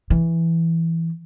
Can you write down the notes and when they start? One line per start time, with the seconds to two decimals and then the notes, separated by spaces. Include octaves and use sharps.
0.10 E3